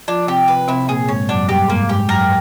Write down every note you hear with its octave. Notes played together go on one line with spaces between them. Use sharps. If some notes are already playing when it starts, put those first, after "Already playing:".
F3 D4 F4
C3 C4 G4
B4
C3 C4 E4
A#2 A#3 G#4
G#2 G#3 C#5
F#2 F#3 D4
G2 G3 G4
G#2 G#3 A#3
G#2 G#3 G4
F#2 F#3 A#4